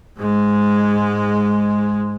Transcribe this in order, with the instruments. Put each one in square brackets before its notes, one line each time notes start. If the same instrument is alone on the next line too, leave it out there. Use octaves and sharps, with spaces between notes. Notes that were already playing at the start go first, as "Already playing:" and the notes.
[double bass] G#2 G#3